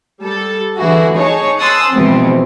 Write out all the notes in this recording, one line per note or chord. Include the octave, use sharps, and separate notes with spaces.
G3 A4
D3 E3 E4 F#4 G#4
D#4 G#4 C#5 A5 C#6
G#5 A5 C6 D#6 E6 F#6
B2 E3 F3 G#3 C4